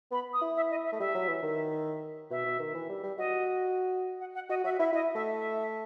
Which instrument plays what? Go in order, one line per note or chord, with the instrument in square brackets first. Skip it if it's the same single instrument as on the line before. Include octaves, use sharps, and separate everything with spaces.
[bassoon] B3 [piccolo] B5
[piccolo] D#6
[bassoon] E4
[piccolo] E5
D#5
E5
[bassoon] A3
[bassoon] G3 [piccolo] E5
[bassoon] F#3
E3
D#3
[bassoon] B2 [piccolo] E5
[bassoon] B2
D#3
E3
G3
G3
[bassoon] F#4 [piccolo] D#5
[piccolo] F#5
F#5
[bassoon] F#4 [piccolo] D#5
[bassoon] F#4 [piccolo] E5
[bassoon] E4 [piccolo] E5
[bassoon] E4 [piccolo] D#5
[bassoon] A3 [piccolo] E5
[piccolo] E5